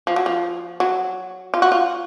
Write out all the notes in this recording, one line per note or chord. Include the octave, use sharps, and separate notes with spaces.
F3
F#3
F3
F#3
F4
F#4
F4